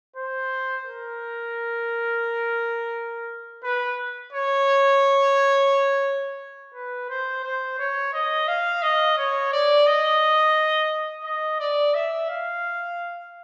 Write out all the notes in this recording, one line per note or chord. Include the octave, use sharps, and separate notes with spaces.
C5
A#4
B4
C#5
B4
C5
C5
C#5
D#5
F5
D#5
C#5
D5
D#5
D#5
D5
E5
F5